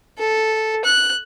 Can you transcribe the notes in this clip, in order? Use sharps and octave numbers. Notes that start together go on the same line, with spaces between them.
A4
F#6